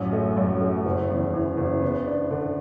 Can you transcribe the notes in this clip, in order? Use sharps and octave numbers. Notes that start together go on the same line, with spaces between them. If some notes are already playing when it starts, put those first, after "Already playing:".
Already playing: A1 F#2
A3
F#2
A3
F#1
E2
E3
F#1
B3
D4
D3